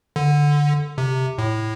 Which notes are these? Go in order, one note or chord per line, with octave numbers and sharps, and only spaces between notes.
D3
C3
A2